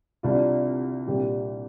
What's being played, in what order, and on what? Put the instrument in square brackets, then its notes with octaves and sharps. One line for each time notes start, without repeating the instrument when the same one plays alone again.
[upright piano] C2 C3 G3 D4 F4
C2 A#2 G3 D4 G4